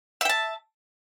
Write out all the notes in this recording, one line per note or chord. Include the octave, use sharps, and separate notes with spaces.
E5 G5 A5